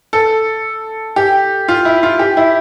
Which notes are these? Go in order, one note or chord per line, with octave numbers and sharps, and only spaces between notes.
A4
G4
F4
E4
F4
G4
E4